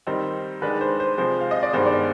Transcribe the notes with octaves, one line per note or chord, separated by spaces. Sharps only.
D#3 G3 C4 D#4 C5
D#3 G#3 D4 B4
C5
C5
C3 F3 G#3 C5
F5
D#5
D5
G2 D#3 G#3 B3 C5
D5